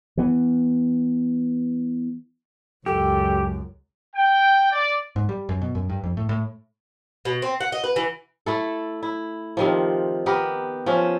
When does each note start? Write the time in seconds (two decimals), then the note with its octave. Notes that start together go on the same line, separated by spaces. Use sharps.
0.17 E3 B3
2.86 C#2 F#2 G4 A4
4.16 G5
4.72 D5
5.16 G#2
5.29 G3
5.49 F#2
5.61 B2
5.75 F#2
5.90 G2
6.04 F2
6.17 A2
6.29 A2
7.25 B2
7.42 C4
7.61 F#5
7.72 D#5
7.84 B4
7.96 E3
8.46 A3 E4 A4
9.03 E4
9.57 C3 D#3 F3
10.26 B3 G4 A#4
10.86 F3 C#4 E5